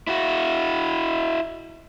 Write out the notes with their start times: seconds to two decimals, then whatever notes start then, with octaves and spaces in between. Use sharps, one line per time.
0.07 E4 F#4